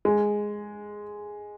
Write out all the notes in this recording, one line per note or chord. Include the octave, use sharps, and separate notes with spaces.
G#3